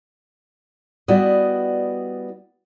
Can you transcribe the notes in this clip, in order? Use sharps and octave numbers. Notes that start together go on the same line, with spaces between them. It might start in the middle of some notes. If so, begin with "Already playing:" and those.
G3 B3 E4 F#4 D5 D#5